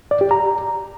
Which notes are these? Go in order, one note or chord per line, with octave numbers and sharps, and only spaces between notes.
D5
G4
A#5